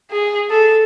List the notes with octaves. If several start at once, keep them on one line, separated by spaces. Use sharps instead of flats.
G#4
A4